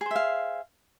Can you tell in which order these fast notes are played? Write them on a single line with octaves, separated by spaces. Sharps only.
G#4 C5 E5 F5